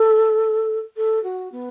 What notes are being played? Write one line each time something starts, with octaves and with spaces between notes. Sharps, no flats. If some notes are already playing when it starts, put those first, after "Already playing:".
Already playing: A4
A4
F#4
B3